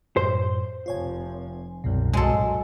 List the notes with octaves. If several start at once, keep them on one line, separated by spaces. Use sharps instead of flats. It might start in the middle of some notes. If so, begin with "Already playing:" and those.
F#2 A2 C5
F1 F3 F4 C#5 G#5
C2 F#2 B2
B1 G2 A#2 F#3 G#3 A4